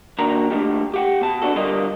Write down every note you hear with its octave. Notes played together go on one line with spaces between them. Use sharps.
D#3 A#3 D4 F#4 A#4 A#5
A3 A#3 D4 D#4 F4 G4
G4 F#5 G5
B2 A5
B3 D4 F#4 A4
D3 G3 F4 A#4 D#5